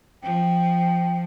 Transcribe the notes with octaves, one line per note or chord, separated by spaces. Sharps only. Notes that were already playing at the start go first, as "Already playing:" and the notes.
F3 G5